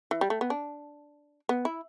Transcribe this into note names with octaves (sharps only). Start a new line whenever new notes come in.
E3
G3
A3
B3
D4
B3
E4